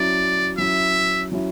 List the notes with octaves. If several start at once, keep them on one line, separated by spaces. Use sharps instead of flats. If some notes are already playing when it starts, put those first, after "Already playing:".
Already playing: F#3 C#4 E4 D5
F#3 C#4 E4 E5
F#3 C#4 E4